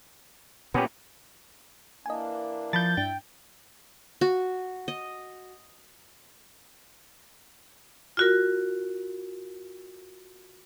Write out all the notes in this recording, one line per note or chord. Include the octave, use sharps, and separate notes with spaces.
A#2 B3 C#4 G4
E3 A#3 D4 D#5 G#5
F3 A5 B5 G6 A6
G2 D4 E4 G5
F#4
D#5
F4 F#4 A#4